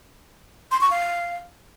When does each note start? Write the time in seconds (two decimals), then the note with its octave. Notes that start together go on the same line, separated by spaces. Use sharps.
0.71 C6
0.81 C#6
0.90 F5